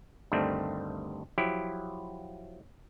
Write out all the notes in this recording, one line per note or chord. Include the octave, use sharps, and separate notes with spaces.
D2 G2 D#3 G3 A3 C4
F3 F#3 E4 G4